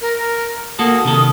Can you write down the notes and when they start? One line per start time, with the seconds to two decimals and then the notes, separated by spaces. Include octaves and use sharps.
0.01 A#4
0.79 A#3 F#4 A4 D#6
1.05 C3 D#3 A4